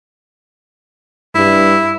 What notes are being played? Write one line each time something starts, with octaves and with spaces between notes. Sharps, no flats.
G2 E4